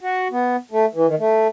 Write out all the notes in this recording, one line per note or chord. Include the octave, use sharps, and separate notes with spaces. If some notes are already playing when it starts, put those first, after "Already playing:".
F#4
B3
A3
E3
D#3
A3